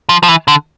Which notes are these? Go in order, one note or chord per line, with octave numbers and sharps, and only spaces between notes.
F3
F3
E3
D3